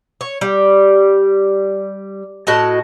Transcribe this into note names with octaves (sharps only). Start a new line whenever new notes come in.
C#5
G3
A2 F#4 D#5 A5